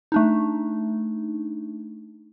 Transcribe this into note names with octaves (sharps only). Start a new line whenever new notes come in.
A3 D4 D#4